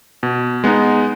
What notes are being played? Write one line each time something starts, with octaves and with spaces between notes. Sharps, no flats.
B2
G#3 B3 D#4